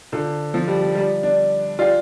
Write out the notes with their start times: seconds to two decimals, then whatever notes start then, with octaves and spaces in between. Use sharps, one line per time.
0.12 D3 F4 C5 A#5
0.54 F3
0.68 G3
0.82 G3
0.95 G3 F4 D5 A#5
1.23 D4
1.79 F4 G4 D5 F5